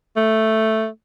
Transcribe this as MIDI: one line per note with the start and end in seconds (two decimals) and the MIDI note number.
0.16 0.87 57